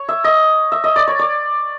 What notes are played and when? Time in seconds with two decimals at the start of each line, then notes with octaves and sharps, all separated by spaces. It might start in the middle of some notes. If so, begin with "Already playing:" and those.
Already playing: C#5
0.09 E5
0.24 D#5
0.72 E5
0.84 D#5
0.96 D5
1.07 C#5
1.19 D5